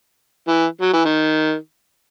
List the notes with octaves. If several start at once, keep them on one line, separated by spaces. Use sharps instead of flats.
E3
F#3
E3
D#3